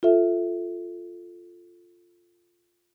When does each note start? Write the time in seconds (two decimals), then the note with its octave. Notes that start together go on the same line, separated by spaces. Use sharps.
0.03 F4 A4 E5